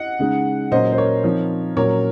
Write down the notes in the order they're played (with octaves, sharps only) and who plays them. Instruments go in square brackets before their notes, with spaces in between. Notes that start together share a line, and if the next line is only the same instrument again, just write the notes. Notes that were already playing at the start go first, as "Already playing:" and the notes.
Already playing: [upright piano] D#5 F#5
C#3 G#3 D#4
A#2 F#3 C#4 C5 D#5
C5
A#4 C#5
F3 C4 D#4
A#2 F#3 C#4 A#4 C#5